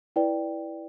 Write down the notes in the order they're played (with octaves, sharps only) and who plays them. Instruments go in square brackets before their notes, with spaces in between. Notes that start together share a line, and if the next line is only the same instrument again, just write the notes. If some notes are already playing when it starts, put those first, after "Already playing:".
[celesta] E4 B4 D5 G5